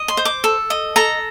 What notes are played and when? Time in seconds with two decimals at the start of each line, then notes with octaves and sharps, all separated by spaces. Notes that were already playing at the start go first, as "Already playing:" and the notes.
Already playing: D#5
0.08 C6
0.17 C5
0.25 D6
0.44 A4
0.70 D#5
0.96 A4 A#5